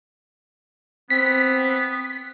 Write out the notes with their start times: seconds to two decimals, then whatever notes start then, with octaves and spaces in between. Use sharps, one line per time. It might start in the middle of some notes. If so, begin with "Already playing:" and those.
1.10 B3 C4 B6